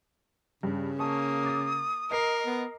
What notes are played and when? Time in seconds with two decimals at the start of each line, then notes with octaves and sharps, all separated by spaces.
0.63 G2 C#3
0.99 A#3 A5 C#6 D#6
1.43 D6 A6
2.11 A#4 D#5 C7
2.46 B3